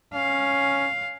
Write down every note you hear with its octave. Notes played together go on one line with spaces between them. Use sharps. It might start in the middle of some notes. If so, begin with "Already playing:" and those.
C#4 F5